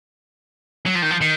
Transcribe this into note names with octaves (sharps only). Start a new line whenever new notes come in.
F#3
F3
D#3
F3
D#3